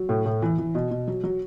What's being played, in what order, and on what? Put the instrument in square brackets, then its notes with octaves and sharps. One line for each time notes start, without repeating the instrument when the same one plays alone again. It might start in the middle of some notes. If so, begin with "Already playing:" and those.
Already playing: [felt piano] F#3
A2
A2
E3
E3
B2
B2
F#3
F#3